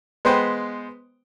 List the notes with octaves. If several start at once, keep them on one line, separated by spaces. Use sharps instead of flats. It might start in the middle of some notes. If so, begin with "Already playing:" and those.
G#3 B3 B4 C5 G5